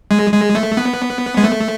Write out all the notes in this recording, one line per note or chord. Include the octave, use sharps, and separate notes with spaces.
G#3
G#3
A3
B3
G#3
A3